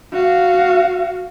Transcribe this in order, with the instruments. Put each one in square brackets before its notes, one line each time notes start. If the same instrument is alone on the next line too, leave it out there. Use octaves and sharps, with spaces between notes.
[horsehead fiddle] F#4 F5